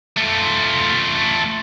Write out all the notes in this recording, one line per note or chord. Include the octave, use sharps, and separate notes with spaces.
A3 F4